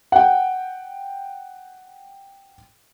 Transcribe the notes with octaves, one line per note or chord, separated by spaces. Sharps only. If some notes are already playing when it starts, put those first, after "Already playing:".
F#5 G5